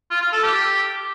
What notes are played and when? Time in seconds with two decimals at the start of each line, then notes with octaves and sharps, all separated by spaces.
0.11 F4
0.21 F4
0.32 A4
0.43 G4